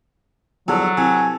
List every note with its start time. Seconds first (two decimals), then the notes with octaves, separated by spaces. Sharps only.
0.68 E2 G2 F3 F#3 A4
0.97 C3 E3 G#5